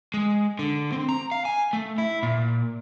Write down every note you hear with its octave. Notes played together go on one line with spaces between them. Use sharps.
G#3
D3
C4
A#5
F5
G#5
A3
E4
A#2